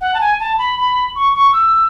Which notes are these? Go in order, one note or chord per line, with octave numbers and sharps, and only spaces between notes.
F#5
A5
G#5
A5
B5
B5
C#6
C#6
E6